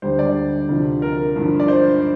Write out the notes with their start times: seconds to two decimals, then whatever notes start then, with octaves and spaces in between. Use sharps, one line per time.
0.02 D2 D3 G3 C5
0.19 D5
0.68 D2 C3 F3
1.02 A#4
1.36 G2 D3 F3
1.60 D5
1.68 C5